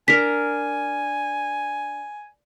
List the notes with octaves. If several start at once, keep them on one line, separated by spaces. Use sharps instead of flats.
D4 A#4 G#5 B6